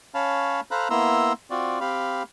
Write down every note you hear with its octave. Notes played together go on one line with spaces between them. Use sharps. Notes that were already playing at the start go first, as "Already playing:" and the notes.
C#4 C#5 F5 A5 B5
A4 C5 F5 A#5 B5 F#6
A#3 B3 E4 A#5 C6 E6
C4 F4 F#4 D5
C4 G4 F5 B5